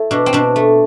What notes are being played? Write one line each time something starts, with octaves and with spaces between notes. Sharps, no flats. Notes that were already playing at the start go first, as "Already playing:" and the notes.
Already playing: A3 E4
B2 D4
C4
B2 D4
A3